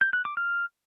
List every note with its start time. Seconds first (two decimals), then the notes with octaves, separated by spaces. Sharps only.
0.01 G6
0.13 F#6
0.25 D6
0.37 F6